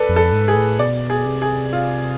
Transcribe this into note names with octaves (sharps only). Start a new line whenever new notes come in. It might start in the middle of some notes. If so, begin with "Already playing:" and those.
Already playing: A4 B4 D5
F2
A4
G#2
G#4
A2
B2 D5
G#4
C3
G#4
F4